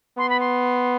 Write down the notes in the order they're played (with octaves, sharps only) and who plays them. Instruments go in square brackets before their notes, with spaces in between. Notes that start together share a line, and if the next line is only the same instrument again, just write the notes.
[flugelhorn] B3 [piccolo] C6
[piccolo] B5
C6